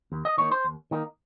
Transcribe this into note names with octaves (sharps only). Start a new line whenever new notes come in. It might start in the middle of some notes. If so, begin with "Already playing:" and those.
D#2
D#5
D#3 A#3 D#4 C#5
C5
D#2
D#3 A#3 D#4